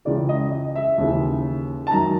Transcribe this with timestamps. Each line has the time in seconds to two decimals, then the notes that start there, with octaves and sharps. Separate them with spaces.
0.05 C#2 C#3 E3 D5
0.29 D#5
0.52 D#5
0.76 E5
0.98 D#2 C#3 E3
1.87 A5
1.91 F#2 D#3 A#5